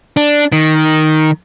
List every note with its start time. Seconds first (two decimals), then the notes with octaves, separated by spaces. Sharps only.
0.17 D4
0.52 D#3